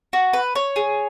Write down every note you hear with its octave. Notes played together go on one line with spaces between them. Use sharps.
F#4
B4
C#5
G#4